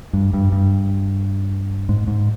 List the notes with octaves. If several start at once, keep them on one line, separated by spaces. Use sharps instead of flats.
G2
G2
G2
G#2
G#2